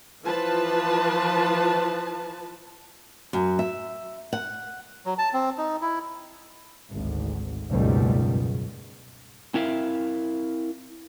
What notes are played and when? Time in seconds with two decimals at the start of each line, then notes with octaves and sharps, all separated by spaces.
0.23 E3 F3 F4 B4 A5
3.33 F#2
3.59 E5
4.33 F#5
5.06 F#3
5.18 A5
5.34 C4
5.58 D#4
5.82 E4
6.91 G#1 D2
7.71 F#1 C#2 G#2 B2 D#3 G3
9.54 C4 E4 A#4 E5 F5